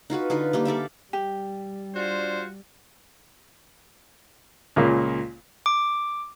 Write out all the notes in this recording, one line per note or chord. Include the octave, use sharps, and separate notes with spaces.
D#4 F4 F#4 B4
D3 D#4 F4 B4
G3 A#3 G4
A4 D5 E5 F5
G3 G4
D4 F4 F#4 C5
C#2 A#2 C#3 A#3
D6